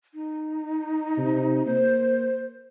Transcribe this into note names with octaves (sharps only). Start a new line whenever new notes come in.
D#4
C3
A#3 C5